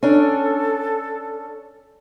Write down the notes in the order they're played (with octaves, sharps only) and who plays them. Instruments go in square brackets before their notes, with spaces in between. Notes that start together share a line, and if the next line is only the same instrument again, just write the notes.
[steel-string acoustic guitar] C#4 D4 [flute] A4